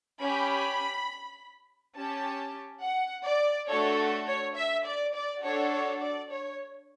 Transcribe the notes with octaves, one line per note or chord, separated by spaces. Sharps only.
C#4 G4 B5
C#4 G4 A5
F#5
D5
A3 D4 F#4 A4 C#5
C#5
E5
D5
D5
D4 F#4 A4 C#5
C#5
D5
C#5